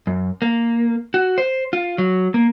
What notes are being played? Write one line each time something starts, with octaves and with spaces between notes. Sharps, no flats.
F#2
A#3
F#4
C5
F4
F#3
A#3